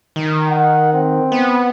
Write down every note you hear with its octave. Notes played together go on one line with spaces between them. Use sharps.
D#3
F#5
C4
B3